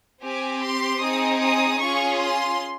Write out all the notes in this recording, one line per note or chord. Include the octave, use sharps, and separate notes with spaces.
C4 G4 G#5
C6
C4 D#4 G#4 D#6
D#6
C#4 F4 G#4 C#6
C6